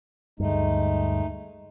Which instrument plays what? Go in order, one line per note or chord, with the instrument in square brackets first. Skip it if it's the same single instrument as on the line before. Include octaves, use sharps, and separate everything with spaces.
[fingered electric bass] D2 G2 [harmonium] G#3 A3 D#4